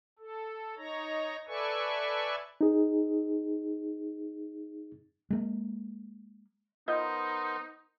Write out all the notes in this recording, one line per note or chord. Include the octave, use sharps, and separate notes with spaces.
A4
D#4 C#5 A#5
A4 B4 D5 E5 G#5 C#6
D#4 G#4
G#3 A#3
B3 D#4 F4 A#4 C5 D#5 G6